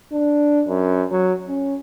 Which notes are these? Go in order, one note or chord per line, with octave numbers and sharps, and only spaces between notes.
D4
F#2
F#3
C#4